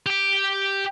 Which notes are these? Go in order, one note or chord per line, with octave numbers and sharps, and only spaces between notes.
G4 G5